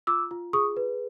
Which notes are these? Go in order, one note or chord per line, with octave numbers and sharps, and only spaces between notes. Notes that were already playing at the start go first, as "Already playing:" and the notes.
F4 D6 E6
F4
G#4 C#6 D#6
B4